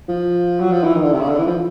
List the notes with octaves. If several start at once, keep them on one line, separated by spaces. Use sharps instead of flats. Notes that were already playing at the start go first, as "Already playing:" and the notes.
F3
F#3
F3
E3
D#3
D3
C3
C#3
D3
E3
F3